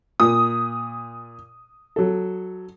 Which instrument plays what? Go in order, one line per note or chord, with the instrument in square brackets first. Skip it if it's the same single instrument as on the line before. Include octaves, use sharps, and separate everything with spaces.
[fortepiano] A#2 [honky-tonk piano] D#6
[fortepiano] F#3 A4